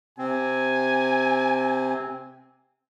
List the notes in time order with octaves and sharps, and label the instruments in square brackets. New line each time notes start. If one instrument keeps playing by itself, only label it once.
[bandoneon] C3 C4 [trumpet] G#5